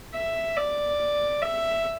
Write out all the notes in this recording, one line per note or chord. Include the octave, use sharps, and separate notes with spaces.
E5
D5
E5